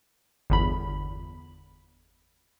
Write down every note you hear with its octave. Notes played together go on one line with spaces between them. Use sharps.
G1 E2 B5